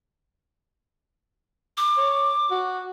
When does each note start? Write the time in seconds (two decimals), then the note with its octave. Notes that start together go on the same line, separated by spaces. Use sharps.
1.77 D6
1.97 C#5
2.51 F#4